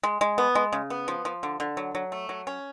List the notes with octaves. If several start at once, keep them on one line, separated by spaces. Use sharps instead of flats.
G#3
G#3
B3
G#3
C#3
B3
F3
F3
D3
D3
F#3
F#3
A3
F#3
C#4